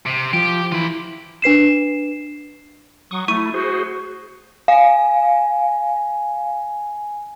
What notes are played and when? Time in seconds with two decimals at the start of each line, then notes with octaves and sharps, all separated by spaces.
0.06 C3
0.33 F3 G4
0.72 E3 F4 B5
1.42 D4 B4 C7 E7
3.11 F#3 C#6 D#6
3.28 A3 E4 C#6 D#7
3.54 F#4 G#4 C5
4.68 F5 G#5